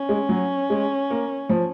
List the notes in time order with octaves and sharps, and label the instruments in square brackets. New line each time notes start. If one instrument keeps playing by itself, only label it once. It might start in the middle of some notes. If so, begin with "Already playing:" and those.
Already playing: [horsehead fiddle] C#4
[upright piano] G#3
F#3
G#3
A#3
F3